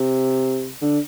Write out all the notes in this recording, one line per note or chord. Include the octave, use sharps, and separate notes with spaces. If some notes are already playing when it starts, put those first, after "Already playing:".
Already playing: C3
D3